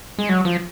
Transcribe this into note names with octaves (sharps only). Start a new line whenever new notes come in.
G#3
F#3
F3